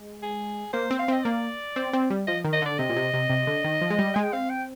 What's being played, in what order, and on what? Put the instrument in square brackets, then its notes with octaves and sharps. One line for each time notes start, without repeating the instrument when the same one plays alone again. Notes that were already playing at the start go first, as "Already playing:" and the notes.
Already playing: [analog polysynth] G#3
[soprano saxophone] G#4
[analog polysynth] A#3 [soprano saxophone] C5
[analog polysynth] C4
[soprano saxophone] F5
[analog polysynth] C4 [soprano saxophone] D#5
[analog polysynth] A#3 [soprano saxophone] D5
[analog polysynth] C4
C4
G3
[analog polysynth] F3 [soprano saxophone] D#5
[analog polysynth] D#3
[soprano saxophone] D#5
[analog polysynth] D3 [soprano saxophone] D5
[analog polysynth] C3 [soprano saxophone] D#5
[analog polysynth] A#2
C3
C3
C3
D3
D#3
F3
G#3
G3
[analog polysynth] G#3 [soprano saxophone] G#5
[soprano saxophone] G5
[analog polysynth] C4 [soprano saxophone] F5
[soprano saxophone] G5